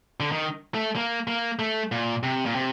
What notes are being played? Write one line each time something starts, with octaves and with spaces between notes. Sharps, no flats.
D3
D#3
A3
A#3
A#3
A3
A#2
C3
A#2
C3